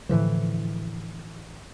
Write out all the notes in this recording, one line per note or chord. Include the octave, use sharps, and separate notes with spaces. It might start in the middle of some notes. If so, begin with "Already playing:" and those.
A2 D3 E3 F3